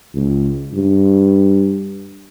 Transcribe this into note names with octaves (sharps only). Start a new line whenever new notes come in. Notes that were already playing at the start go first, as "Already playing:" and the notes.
C#2
G2